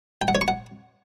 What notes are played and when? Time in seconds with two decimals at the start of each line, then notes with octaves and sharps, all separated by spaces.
0.22 G5
0.28 F#5
0.35 C#5
0.41 C#6
0.48 F#5